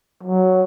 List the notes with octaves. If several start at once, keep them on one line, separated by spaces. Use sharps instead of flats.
F#3